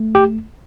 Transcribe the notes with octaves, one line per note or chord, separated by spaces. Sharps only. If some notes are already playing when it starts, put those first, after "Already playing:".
Already playing: A3
G4